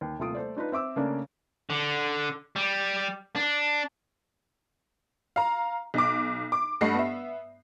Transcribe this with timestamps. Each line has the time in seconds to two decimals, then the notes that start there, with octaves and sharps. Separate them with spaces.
0.01 D#2
0.19 D#1 C3 A3 F4 D#6 D7
0.35 A3 C5 D5
0.57 D4 D#4 F4 B4
0.72 C4 E5 D6 E6
0.96 C#3 A3 A#3 C#4 D4
1.70 D3
2.56 G3
3.36 D4
5.36 F5 A#5
5.94 B1 D6
6.52 D6
6.81 G2 A3 D#5 F#5 B5 C7
6.94 B3 E5